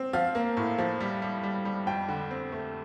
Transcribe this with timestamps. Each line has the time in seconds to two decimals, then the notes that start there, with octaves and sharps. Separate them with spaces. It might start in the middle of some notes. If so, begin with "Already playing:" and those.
Already playing: C4
0.13 F3 F5
0.35 A#3
0.57 A2
0.78 F3
1.00 G3
1.22 G3
1.43 G3
1.65 G3
1.87 F2 G5
2.08 D3
2.31 C4
2.52 A3